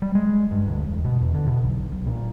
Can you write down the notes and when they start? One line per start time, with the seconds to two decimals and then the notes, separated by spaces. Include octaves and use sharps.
0.02 G3
0.15 G#3
0.51 G2
0.67 D2
0.85 E1
1.04 B2
1.21 E2
1.34 D3
1.47 B2
1.64 B1
1.92 B1
2.06 A#2